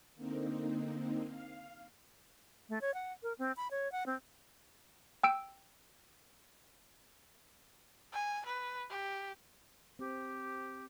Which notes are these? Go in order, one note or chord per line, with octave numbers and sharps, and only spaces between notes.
D3 A#3 C4 D#4
F5
A3
C#5
F#5
A#4
C4
B5
C#5
F#5
C4
G5 E6 D7
G#5
B4
G4
C4 G4